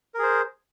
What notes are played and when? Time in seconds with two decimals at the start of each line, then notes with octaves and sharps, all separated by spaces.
0.14 A#4
0.19 G#4
0.23 C5